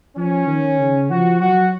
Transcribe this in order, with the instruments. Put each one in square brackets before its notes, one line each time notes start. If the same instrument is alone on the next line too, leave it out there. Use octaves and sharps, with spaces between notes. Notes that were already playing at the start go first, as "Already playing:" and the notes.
[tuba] F3 [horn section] C#4
[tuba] D#3
C#3
[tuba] F3 [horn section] F#4
[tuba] F#3 [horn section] F#4